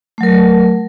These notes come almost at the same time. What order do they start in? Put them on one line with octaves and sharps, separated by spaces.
A3 F#3 A#4